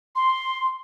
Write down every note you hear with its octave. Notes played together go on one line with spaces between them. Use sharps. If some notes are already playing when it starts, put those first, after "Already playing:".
C6